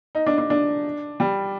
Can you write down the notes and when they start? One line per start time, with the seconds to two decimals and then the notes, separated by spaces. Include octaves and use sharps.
0.15 D#4
0.26 D4
0.38 D4
0.50 D4
1.20 G3